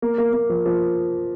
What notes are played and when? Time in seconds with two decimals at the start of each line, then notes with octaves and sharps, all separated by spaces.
0.02 A#3
0.18 A#3
0.33 A#3
0.50 F3
0.66 F3